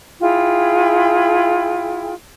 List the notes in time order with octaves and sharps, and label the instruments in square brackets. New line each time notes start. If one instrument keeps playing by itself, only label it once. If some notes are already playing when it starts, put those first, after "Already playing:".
[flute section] E4 F4 G#4 G5